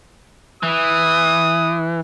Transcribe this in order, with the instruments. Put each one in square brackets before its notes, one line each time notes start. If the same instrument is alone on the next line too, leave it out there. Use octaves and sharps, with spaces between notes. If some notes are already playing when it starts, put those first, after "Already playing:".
[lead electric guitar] E3 [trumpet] D#6